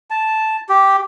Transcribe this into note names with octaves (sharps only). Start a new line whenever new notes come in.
A5
G4